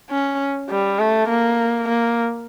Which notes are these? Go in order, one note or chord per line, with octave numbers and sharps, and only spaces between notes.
C#4
G3
A3
A#3
A#3